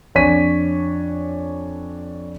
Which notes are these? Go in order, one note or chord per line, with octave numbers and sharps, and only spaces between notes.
F2 D4 C#5 G#5 B6 D#7